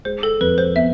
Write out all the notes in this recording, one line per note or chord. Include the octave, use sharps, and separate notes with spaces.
G#3 C5
A4
F2 B4
C5
B3 E5